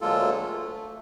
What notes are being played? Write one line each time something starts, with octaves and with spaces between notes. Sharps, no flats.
D2 F#3 G#3 A#3 F4 A4
A3